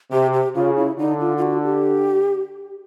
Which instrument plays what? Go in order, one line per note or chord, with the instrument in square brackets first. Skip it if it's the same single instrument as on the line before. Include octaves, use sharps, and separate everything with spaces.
[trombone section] C3 [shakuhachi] G4
[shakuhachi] G4
[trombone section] C#3 [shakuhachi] F4
[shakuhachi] E4
[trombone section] D3 [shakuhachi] D#4
[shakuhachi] F4
F4
F#4
G4